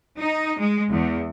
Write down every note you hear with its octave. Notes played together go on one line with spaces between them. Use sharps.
D#4
G#3
E2